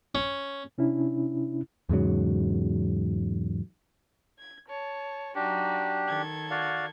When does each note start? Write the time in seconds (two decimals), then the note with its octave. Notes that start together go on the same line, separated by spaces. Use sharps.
0.15 C#4
0.78 C3 C#4 D4 E4
1.89 E2 G#2 C#3 F#3
4.38 G#6
4.68 C#5 A5
5.35 F#3 D4 D#4 F#4 G4
6.07 D#3 A4 G#6
6.51 F#4 D5 F5